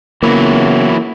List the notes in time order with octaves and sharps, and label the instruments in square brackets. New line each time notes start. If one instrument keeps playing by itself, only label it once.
[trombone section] C#3 B3 [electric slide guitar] E3 F#3 E4 [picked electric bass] A#3